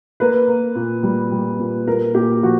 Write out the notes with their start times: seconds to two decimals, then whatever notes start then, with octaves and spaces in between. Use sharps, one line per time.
0.20 A#3 B4
0.48 A#3
0.75 A#2
1.03 G3
1.32 G3
1.59 A#2
1.87 A#2 A#4
2.15 A#2 G4
2.43 F3 F#4